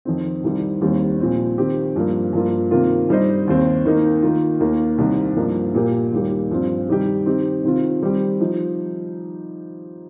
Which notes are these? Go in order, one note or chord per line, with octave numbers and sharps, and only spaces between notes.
F2 D#3 C4
C2 C3 D#3 G3 C4
D#2 D#3 G3 C4 G4
A#2 F3 C4
D#3 C4 G4
G2 F3 A#3
G2 F3 A#3 F4
C3 D#3 A#3 F4
G2 G3 D#4 C5 D#5
D#2 D#3 C4
D#3 A#3 D#4
D#3 A#3 F4
D#2 D#3 A#3
C2 C3 D#3
G2 F3 A#3 D#4
A#2 A#3 G4 A#4
D#2 D#3 G3 A#3 G4
G2 F3 C4 F4
C3 D#3 G3 D#4 G4
D#3 C4 D#4 G4
C3 D#3 C4 F4
D#3 G3 C4 G4
F3 D#4